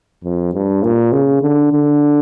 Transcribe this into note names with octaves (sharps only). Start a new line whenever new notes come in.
F2
G2
A#2
C#3
D3
D3